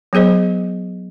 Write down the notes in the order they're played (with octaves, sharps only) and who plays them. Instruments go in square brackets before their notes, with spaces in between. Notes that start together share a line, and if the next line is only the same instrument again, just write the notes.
[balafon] F#3 B3 G#4 C5 D#5